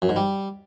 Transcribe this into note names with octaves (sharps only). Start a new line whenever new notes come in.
F#2
G#2
G3